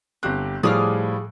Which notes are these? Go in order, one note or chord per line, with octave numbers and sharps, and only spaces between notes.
G1 C4 G4 F#6
A2 F3 G3 G#4 D6 F6